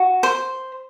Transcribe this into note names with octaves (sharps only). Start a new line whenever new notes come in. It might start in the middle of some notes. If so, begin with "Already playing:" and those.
Already playing: F#4
C5